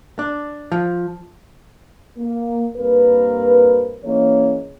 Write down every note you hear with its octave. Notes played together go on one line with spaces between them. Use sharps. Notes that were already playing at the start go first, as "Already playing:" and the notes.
D4
F3
A#3
G2 A#3 C4 A#4 B4
E3 G#3 A#3 C#4 C#5